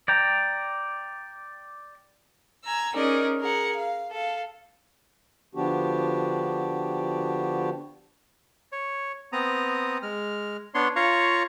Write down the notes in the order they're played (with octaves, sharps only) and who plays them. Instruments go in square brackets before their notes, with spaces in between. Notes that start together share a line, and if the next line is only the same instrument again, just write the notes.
[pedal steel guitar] D5 G5 A#5
[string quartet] G#5 A#5 E6
C#4 D#4 G#4 A#4 D5 D#5
G#4 A#4 F#5
F5
A4 F5
[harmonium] D3 F3 B3 D4 F#4 G4
[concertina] C#5
B3 C4 A#5 D#6
G#3 F6
B3 D4 C#5 C6
F4 C#5 F5 A#5 C#6